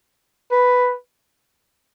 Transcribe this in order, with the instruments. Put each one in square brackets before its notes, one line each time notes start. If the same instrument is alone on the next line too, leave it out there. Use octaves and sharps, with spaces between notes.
[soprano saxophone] B4